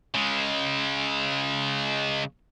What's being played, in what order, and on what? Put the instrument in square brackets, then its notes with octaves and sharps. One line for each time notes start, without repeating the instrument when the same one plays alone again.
[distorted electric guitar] C#3 G#3